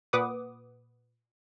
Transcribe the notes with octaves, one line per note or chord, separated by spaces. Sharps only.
A#2 B4 F#5 D6 D#6